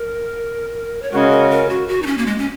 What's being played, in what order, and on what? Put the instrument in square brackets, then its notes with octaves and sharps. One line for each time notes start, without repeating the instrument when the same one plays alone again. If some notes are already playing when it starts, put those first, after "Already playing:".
Already playing: [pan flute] A#4
C#5
[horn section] C#3 G#3 F#4 [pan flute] A#4
[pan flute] A#4
A#4
F#4
F#4
D#4
C#4
A#3
G#3
C#4